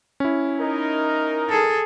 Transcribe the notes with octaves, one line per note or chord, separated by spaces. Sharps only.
C#4 E4
D#4 A#4
G#4 A4